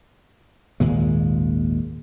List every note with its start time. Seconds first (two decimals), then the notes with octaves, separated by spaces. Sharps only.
0.80 G#1 D#2 A#2 G#3